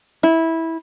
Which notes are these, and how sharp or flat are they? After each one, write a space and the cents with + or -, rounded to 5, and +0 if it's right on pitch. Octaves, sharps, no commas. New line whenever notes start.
E4 -15